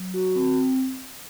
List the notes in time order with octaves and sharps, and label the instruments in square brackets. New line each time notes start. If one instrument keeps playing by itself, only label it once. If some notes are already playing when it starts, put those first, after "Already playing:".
Already playing: [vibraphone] F#3
F#4
C4